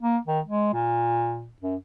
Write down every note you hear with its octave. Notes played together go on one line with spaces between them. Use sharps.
A#3
D#3
G#3
A#2
F#2